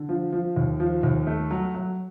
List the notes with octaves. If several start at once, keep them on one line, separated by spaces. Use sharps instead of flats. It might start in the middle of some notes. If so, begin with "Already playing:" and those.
Already playing: D3
F3
F3
D#2
F3
D#2
A3
F#3
F#3